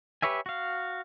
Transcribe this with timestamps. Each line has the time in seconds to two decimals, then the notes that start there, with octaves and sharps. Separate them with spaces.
0.22 G4 B4 C#5 E5 G#5
0.46 F#4 F5